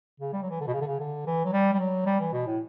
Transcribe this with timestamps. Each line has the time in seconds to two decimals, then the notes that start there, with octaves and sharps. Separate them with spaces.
0.20 C#3
0.32 G3
0.42 F#3
0.50 E3
0.60 D3
0.67 B2
0.74 C#3
0.81 D3
0.87 C#3
0.99 D3
1.26 E3
1.45 F#3
1.53 G3
1.73 G3
1.79 F#3
2.06 G3
2.19 E3
2.33 B2
2.46 A2